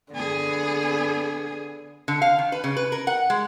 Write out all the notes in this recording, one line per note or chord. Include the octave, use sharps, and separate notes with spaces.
D3 B3 G#4
D3
F5
D#3
B4
C#3
B4
A#4
F#5
G#3